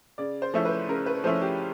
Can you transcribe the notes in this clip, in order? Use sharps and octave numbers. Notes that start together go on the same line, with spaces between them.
C#3 D5
C5
F3 A3 C#4 E4
B4
C#3 A#4
B4
F3 A3 C#4 E4 C5
G4